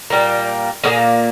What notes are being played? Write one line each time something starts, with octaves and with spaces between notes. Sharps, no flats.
A#2 G3 A#3
A#2 G3 A#3 G#4